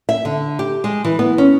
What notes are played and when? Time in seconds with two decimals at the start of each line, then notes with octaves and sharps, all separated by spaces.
0.09 E5
0.25 D3
0.59 G4
0.84 G#3
1.04 E3
1.19 B3
1.38 C#4